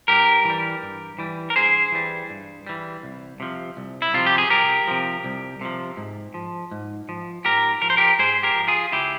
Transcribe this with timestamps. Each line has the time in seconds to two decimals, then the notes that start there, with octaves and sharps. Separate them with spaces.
0.08 G2 G4 A#4
0.45 E3 G3
0.82 G2
1.19 E3 G3
1.50 A#4
1.56 G2 G#4 C5
1.92 E3 G3
2.30 G2
2.66 E3 G3
3.03 C2
3.40 C3 F3
3.77 C2
4.02 E4
4.14 C3 F3 F4
4.26 G4
4.38 G#4
4.50 C2 G4 A#4
4.87 C3 F3
5.24 C2
5.61 C3 F3
5.97 G#2
6.34 F3
6.71 G#2
7.09 F3
7.45 G#2 G4 A#4
7.82 F3 A#4
7.90 C5
7.97 G4 A#4
8.19 G#2 G#4 C5
8.43 G4 A#4
8.55 F3
8.68 F4 G#4
8.92 C#2 E4 G4